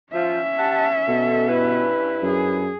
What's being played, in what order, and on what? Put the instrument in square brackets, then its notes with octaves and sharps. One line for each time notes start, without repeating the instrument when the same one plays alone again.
[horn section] F3 [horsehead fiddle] C#4 E5
[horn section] G4 F#5 A5
[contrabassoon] B2 [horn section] A4
[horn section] G2 E4 B4
[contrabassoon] F#2 [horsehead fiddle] G#4